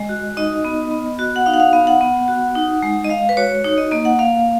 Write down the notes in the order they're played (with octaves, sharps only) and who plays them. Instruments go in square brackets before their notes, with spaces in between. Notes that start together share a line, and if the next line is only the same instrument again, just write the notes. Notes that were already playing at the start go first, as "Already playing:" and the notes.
Already playing: [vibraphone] G#3 D#5
F#4
D#4 D#5
B3
B3
F#4
F#5
D#4 F5
F#5
F5
B3 F5
F#5
B3
F#4
D#4
G#3
D#5
G#3 F5
B4
F#4 C#5
D#4 C#5
D#5
A#3 D#5
F#5
A#3 F5